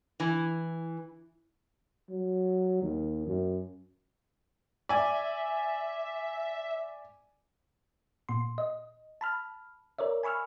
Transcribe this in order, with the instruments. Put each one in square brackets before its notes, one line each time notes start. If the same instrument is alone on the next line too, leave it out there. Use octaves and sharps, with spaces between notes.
[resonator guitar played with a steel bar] E3
[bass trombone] F#3
D#2
F#2
[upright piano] D5 G#5 [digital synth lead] E5
[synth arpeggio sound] A#2 C6
D#5
A5 B5 F6
A#4 C#5 D5 E5
G#5 B5 C#6 E6 F6